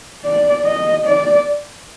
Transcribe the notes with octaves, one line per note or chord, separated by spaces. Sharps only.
D5
D#5
D5